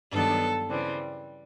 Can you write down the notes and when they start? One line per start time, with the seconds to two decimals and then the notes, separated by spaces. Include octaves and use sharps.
0.12 G2 D#3 F#3 B3 D4 A4
0.69 C#3 E3 G3 C4